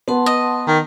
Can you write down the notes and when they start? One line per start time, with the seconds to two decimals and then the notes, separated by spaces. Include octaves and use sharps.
0.08 B3 F#5 A5 C6
0.26 D#5
0.67 D#3